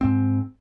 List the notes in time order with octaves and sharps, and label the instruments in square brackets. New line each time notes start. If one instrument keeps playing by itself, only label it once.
[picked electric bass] G#2 C4